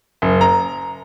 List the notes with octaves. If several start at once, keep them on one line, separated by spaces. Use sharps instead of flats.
F#1
A#5